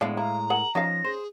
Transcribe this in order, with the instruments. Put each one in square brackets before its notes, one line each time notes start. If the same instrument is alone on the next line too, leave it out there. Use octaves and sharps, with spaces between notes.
[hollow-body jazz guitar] A2 G#3 [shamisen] D3 B3 F5
[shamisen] E4 [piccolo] F5 [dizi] A#5
[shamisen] G#4 A#4 F#5 [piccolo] F#7
[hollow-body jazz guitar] F3 [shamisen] C#4 D#4 F5 [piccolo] A#6
[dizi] G#4 [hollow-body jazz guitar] C5